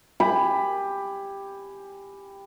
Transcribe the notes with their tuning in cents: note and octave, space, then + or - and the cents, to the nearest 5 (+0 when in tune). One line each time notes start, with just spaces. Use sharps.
G4 +10 G#5 +0 B5 +10